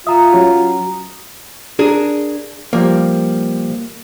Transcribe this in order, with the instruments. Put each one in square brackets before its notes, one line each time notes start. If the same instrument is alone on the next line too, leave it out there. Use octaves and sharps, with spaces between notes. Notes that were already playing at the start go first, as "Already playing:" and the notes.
[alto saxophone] F4 [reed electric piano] E5 [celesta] A#5 D#6
[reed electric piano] F#3 C#4 F#4
[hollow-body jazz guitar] D4 G#4 A#4
[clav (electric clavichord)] F3 G3 [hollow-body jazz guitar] A#3